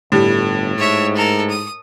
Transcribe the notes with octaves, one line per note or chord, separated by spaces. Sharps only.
G1 A2 G3
G#2 C#5 E5
A4 A#4
D#6